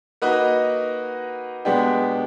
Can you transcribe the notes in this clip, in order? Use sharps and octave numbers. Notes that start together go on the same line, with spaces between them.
A#3 D#4 F#4 B4 D#5
B2 G#3 B3 D4 G4